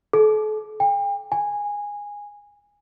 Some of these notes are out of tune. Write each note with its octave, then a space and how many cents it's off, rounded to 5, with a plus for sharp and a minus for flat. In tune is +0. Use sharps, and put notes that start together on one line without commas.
A4 -40
G5 +40
G#5 -15